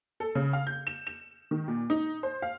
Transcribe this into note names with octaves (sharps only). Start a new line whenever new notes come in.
A4
C#3
F5
G6
E7
E7
D#3
A#2
D#4
C5
F5